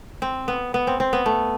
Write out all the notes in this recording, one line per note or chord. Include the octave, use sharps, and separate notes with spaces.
C4
B3
B3
C4
C4
B3
A3